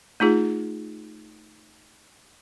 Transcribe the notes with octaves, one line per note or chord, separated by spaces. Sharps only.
A3 D#4 F4 G#4